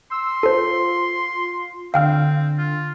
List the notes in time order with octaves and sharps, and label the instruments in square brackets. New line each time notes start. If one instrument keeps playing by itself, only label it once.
[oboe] C6 [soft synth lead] E6
[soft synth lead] F4 [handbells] A4 C5
[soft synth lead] D3 [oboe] C4 [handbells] F5 G5 F6
[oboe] F4